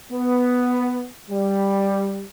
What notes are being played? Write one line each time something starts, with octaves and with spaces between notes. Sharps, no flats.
B3
G3